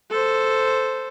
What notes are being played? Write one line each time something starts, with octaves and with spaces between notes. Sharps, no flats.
A4 C5